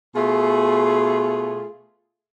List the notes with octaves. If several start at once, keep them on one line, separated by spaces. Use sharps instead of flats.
B2 A3 F4 G#4